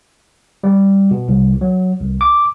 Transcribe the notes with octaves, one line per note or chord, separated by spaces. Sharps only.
G3
B2
C2
F#3
C2
D6